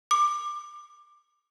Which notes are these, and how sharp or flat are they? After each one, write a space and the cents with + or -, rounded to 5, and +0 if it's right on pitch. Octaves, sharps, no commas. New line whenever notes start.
D6 +20